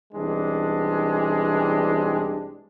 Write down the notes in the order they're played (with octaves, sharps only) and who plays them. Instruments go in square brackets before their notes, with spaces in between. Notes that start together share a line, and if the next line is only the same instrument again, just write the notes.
[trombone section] B1 E3 G3 G#3 C4 D4